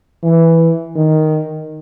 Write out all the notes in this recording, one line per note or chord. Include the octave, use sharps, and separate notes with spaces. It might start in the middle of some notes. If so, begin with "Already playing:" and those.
E3
D#3